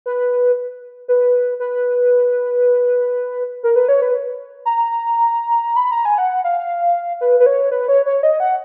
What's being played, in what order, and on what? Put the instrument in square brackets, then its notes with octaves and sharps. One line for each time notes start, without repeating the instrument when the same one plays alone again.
[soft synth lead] B4
B4
B4
A#4
B4
C#5
B4
A#5
B5
A#5
G#5
F#5
F5
B4
B4
C#5
B4
C#5
C#5
D#5
F#5